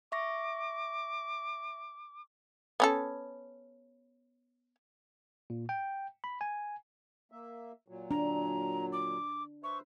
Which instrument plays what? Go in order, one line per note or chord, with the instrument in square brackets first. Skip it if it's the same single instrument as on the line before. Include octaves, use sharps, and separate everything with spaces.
[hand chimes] E5 C#6 A#6 [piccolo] D6
[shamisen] B3 C#4 A4
[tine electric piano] A#2
G5
B5
G#5
[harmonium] A#3 E5
A#2 F#3
[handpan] D4 [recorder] A#5
[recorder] D6
[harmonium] B4 C5 E5 [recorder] C#6